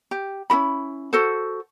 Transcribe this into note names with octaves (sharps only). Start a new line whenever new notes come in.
G4
C#4 E4 F#4 B5
F#4 A4 C5